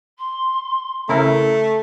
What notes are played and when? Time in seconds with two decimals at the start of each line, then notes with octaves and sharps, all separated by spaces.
0.18 C6
1.09 C#3 A3 E4 A4 A#4